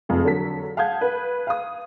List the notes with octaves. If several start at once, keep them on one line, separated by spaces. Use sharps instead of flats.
F1 F2 G#4
D3 F#3 A4 B6
F5 F#5 A5 D#6 G6 G#6
B4
F5 D#6